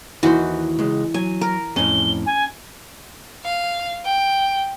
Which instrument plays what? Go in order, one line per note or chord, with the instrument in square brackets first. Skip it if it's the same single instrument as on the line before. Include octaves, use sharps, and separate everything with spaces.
[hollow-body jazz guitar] D#2 D#3 C5 [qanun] E3 F#4
[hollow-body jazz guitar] C#2 G#3
[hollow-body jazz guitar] F#3 [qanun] G#5
[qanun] A#4
[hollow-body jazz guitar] F2 A2 [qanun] C#4 [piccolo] G7
[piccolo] G#5
[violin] F5
G5